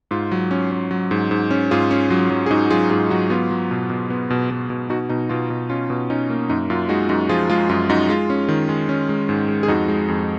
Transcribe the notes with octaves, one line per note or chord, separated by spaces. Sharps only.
G#2 F4
F#3
C#4
C#4
F#3
G#2
G#2
C#4
G#2 F4 G#4
C#4
F#3 F4
F#3
G#4
G#2 D#4 F#4
F#3 F4 G#4
G#2 F4 G#4
F#3 D#4 F#4
B3 F4
F#3
B2
B2
B3
B2
B2
B2
B2 D#4 F#4
B2 D#4
B2 F4
B2
C#4 F4
B2
C#4 D#4
A#3
F#2 D#4
F#2 F4
G#3 D#4 F#4
F#2 D#4 F#4
F3 F4 G#4
G#3 F4
F#2 F4
F#2 D#4 F#4
G#3 F4
C#4
D#3
G#3
C#4
G#3
G#2
G#3
G#4
F2 D#4 F#4
G#3
F2